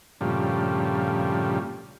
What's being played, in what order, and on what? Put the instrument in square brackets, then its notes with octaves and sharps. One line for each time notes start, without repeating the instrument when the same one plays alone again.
[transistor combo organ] G2 A#2 C#3 F3 G3 A3